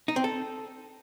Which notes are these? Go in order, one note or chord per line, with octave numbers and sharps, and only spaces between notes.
D#4
C4
A4